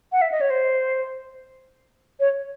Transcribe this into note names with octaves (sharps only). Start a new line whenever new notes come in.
F#5
E5
D#5
C#5
C5
C#5